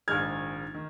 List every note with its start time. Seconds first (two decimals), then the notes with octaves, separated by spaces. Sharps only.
0.08 A#1 G#2 D#3 G#3 F6 G#6
0.74 D#3